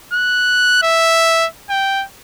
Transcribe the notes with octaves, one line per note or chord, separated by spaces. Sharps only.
F#6
E5
G5